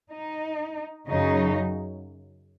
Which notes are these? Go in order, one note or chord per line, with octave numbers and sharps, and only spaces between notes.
D#4
F#2 C#3 F#3 D#4